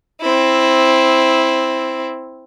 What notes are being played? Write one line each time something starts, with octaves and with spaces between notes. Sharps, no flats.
C4 E4